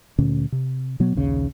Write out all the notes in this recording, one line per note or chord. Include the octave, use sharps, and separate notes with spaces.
D2 A#2 D3 C#4
C3
B2 F#3 B3
A#1 D#2 C#3